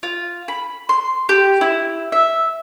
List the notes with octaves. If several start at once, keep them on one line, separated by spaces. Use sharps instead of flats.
F4
B5
C6
G4
E4
E5